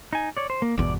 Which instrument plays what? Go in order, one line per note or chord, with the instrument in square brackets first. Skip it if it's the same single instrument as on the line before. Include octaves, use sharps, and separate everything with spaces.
[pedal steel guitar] D#4 G#5
C#5 D5
C5
A#3
[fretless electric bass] G1 E2 B2 [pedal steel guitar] D5